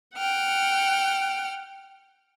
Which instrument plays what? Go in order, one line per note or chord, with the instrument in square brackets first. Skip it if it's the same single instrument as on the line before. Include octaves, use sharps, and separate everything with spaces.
[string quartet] F#5 G5 F6